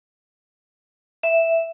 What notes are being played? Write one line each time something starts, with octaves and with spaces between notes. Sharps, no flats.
E5